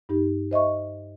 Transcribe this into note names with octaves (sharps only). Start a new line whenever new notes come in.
G2 D#4 G4
C5 D#5 E5 C#6